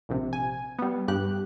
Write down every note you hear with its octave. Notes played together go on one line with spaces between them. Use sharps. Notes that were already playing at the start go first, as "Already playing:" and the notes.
A#1 C3
G#5
G3 B3
G2 G4 F#6